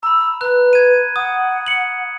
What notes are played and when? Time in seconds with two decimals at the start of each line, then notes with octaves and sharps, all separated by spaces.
0.03 A#5 B5 E6
0.41 B4 A#5 F#6
0.73 G#6 D#7
1.16 F#5 D#6
1.66 C#7 F#7